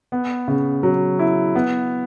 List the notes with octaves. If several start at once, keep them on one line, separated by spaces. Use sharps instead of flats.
B3
C#3
F#3
E4
B3